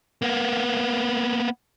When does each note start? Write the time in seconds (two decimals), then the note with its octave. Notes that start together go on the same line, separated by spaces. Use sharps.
0.22 A#3 B3